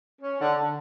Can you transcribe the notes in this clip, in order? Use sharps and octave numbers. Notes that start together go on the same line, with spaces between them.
C#4
D3
D3